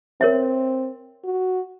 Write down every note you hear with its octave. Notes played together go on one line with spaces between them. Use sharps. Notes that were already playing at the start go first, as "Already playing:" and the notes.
C4 A#4 C#5 E5
F#4